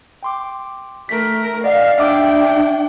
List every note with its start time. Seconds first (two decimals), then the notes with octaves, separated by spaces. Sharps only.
0.23 G5 C6 D6
1.09 A3 A#4 B6
1.64 D5 D#5 F5 F#5
1.98 D4 E5 G5 D6